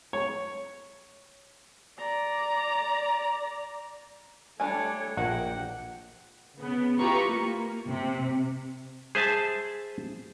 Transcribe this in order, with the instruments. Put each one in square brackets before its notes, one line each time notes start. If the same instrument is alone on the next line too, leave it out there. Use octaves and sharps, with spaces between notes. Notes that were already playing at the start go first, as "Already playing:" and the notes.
[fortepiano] C#5
[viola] D5 A#5
[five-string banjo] G3 D4 G#5 [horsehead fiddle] A3 C#5
[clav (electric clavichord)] A#1 [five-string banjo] A#3 [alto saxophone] F#5 [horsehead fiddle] G5
[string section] C#3 B3
E4 F4 G4 B4 A#5 C#6
A#3
C3
[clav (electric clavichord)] G#4 C5 E5 A5